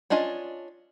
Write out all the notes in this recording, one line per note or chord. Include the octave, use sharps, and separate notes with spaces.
C#4 D4 F4 D#5 G#5